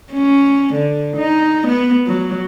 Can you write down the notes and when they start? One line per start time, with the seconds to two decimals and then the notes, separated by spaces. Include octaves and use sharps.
0.13 C#4
0.74 D3
1.17 D#4
1.68 B3
2.07 F#3